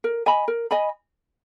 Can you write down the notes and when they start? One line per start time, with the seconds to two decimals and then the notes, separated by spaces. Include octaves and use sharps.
0.04 A#4
0.26 D#5 G#5 B5
0.48 A#4
0.71 D#5 G#5 B5